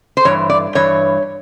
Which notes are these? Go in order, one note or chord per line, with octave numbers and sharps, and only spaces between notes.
C5
G2 E3 C#5
D5
G2 E3 C#5